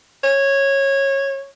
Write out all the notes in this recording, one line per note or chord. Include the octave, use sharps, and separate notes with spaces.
C#5